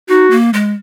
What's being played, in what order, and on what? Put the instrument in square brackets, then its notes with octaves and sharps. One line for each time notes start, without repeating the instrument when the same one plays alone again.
[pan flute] D#4 [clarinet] F#4
[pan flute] A#3
G#3